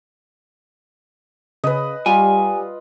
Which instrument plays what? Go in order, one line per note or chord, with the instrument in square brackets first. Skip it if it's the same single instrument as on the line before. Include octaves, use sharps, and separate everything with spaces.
[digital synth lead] C#3 [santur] B4 D#5
[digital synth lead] G3 [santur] F4 [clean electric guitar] G#5